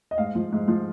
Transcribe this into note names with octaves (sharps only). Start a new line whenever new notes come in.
D#5
G#2 F5
F3
G#2
F3